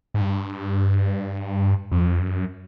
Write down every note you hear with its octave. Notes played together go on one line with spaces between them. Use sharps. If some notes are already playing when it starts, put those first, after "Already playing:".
G#2
G2
F2
F#2